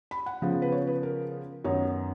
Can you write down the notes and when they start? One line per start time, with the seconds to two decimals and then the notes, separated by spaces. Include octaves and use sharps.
0.11 B5
0.26 F#5
0.42 C#3 F3 B3
0.62 B4
0.72 C#5
0.87 B4
1.03 A#4
1.64 F#2 D#3 F#3 B3 D#4 C#5